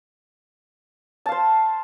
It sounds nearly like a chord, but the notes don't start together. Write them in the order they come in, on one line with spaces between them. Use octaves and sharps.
A5 F5 C5